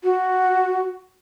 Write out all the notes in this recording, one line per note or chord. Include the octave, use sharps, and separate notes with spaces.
F#4